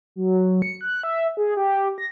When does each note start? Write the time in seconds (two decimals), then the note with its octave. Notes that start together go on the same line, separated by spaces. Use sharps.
0.16 F#3
0.62 C#7
0.81 F#6
1.03 E5
1.37 G#4
1.57 G4
1.98 A#6